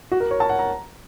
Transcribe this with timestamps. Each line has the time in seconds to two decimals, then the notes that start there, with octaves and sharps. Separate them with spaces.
0.11 F#4
0.20 A#4
0.31 C#5
0.40 A5
0.49 F#5
0.59 A#5